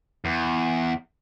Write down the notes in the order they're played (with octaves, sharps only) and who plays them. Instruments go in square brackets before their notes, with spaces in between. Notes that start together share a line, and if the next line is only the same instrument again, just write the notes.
[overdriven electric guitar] E2